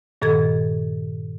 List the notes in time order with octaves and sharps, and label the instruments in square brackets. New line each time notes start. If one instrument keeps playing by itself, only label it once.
[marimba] G2 A#2 D#3 A4 D#5 G#6